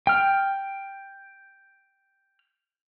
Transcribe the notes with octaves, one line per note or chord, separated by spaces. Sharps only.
G5 F6